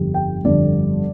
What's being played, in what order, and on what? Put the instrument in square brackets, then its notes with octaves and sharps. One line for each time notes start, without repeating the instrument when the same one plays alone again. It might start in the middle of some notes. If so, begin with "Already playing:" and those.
Already playing: [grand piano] G1 F2 D3 G3
G5
G1 F2 D3 G3 D5